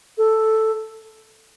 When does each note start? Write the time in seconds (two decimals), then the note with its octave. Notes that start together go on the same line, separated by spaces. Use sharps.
0.18 A4